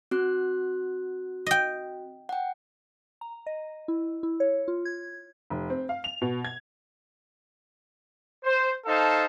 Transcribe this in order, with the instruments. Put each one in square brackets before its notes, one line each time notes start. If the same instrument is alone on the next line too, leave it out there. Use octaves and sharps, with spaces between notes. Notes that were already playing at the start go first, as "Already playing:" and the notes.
[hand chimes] C4 F#4 F#6
[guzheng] D#5 G5
[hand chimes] F#5 G5
[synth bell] A#5
D#5
E4
E4
C#5
F4
G#6
[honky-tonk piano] F1
C4
F5
F7
B2
G#6
[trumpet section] C5
D#4 A4 C5 F5 A5